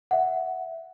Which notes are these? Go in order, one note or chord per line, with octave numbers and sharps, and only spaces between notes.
E5 F#5